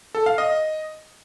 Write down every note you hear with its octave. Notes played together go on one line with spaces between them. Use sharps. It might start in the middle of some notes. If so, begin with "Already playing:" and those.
A4
F5
D#5